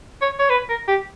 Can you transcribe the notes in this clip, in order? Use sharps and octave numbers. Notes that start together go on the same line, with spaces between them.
C#5
C#5
B4
A#4
G4